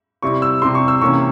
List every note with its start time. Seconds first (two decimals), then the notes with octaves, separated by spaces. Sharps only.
0.22 C3 G3 C4 E4 C#6
0.42 E6
0.62 C3 G3 C4 E4 C6
0.75 C#6
0.88 E6
1.01 C3 E3 A#3 C#4 C#6